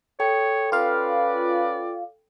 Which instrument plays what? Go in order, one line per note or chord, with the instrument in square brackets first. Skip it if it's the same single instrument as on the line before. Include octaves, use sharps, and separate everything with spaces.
[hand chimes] A4 G5 [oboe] C#5
[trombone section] C#4 B4 [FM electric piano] F4 F5 [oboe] D5